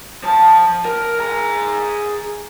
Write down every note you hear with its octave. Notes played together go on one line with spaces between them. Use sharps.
F3 A5
A#4
G#4 A#5